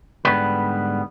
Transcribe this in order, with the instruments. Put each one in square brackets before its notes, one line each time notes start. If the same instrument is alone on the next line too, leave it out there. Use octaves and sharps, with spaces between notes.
[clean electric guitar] G#2 B2 D3 G3 B3 B4